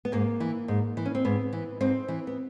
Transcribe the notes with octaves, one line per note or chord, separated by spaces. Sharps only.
B3
G#2 A#3
E3
G#2
E3
C#4
C4
G#2 B3
E3
G#2 C4
E3
B3